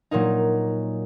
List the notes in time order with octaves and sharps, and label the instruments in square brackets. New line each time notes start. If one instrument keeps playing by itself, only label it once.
[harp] A#2 F#3 A#3 D#4